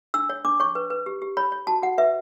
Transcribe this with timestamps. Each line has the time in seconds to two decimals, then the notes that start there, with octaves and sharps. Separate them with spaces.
0.14 D4 E6
0.29 C#5
0.45 D4 D6
0.60 C#5 C#6
0.75 B4
0.90 B4
1.06 G4
1.22 G4
1.37 C#5 B5
1.52 C#5
1.67 F#4 A5
1.82 F#4 F#5
1.98 B4 E5